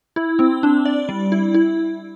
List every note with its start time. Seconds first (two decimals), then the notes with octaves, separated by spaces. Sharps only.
0.16 E4
0.39 C4
0.63 D4
0.85 D5
1.09 G3
1.32 E4
1.54 E4